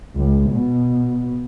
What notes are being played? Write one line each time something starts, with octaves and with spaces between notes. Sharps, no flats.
C#2
B2